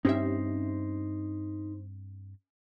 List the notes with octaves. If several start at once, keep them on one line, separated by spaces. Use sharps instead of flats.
G2 C4 C#4 D#4 G4 C5 E5